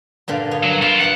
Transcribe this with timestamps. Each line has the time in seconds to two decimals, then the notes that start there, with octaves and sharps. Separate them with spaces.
0.28 G2 A#2 D3
0.51 B3 C#5 D#5
0.63 F#3
0.82 E4 F4 F5 G#5
1.00 G2 D#4 F5 F#5